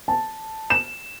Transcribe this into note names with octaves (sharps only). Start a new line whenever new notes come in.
A5
E7